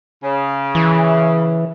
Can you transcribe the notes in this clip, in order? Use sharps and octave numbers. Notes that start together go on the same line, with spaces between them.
C#3
E3